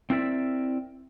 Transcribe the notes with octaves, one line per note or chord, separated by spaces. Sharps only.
C4 E4 A#4 D5 E5